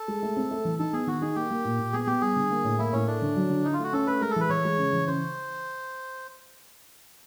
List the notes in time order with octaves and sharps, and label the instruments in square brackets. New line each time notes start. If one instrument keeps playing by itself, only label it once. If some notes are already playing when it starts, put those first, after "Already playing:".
Already playing: [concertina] A4
[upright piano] G#3
A3
C4
A3
E3
[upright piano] D#4 [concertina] A4
[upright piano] B3 [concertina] G#4
[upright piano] D#3 [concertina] F#4
[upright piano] D#4 [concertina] G#4
[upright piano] A#3 [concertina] G4
[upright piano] A#3
A#2
A#2
[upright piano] B3 [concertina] G#4
[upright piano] B3 [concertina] G4
[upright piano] G3 [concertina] G#4
[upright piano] D3
A#3
A2
[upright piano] A#3 [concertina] E4
[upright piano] A2 [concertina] C#4
[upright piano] A3 [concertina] D4
[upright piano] D3
F#3
D3
[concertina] D#4 [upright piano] E4
[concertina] F4
[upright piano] A3 [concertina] F#4
[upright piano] C#4 [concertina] A4
[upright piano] A3 [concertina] B4
[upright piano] G#3 [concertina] A#4
[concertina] A4
[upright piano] E3
[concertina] B4
[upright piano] E3 [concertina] C#5
[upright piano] G#3
C#3
E3
[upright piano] C#3 [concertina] C5